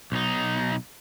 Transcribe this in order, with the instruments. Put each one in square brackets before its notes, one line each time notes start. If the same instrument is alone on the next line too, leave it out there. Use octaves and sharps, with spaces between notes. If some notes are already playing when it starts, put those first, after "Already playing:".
[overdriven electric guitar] B1 D#4